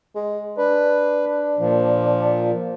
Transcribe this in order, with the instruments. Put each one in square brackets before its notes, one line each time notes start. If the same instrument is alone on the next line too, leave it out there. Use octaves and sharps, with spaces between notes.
[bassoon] G#3
[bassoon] D4 [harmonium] B4
[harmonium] A#2 F3